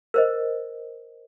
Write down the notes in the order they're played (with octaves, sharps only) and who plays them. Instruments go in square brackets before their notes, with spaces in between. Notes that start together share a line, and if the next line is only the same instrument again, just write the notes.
[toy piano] A#4 C5 D#5